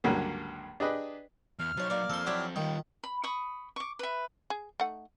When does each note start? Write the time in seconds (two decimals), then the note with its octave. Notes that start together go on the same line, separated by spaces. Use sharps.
0.04 C#2 G2 D3 F#3 A#3
0.80 D4 G4 G#4 B4 D#5
1.59 E2 F6
1.77 F3 F#3 D#4 C#5
1.90 A#3 D5
2.10 F3 C4 A4 C6
2.27 F#3 D4 E4 G4
2.56 D#3 G3 F4 G5
3.04 B5
3.24 B5 C#6 D#6
3.76 C#6 D6
3.99 B4 E5
4.50 G#4
4.80 A3 D#4 F#5